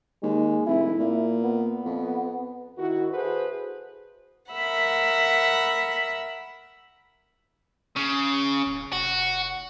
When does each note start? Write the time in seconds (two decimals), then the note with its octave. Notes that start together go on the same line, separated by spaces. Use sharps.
0.23 D#2 G#3
0.67 F1 E4
0.99 A#2
1.43 B3
1.85 F2
2.78 D#3 E4 F#4
3.11 E4 F#4 G#4 A4 B4 C5
4.52 A#4 E5 F#5 B5
7.96 C#3
8.67 D1
8.93 F1 F#4